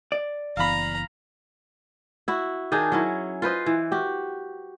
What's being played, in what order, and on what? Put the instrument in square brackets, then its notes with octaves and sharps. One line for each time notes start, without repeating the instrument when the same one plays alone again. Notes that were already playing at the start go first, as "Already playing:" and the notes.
[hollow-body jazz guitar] D5
[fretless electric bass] F#1 E3 B3 [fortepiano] F5 B5 [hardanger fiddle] A#5
[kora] E4 F#4
D#3 D4 D#4 G#4
F#3 C#4 E4
F4 B4 C5 D#5
E3
F#4 G4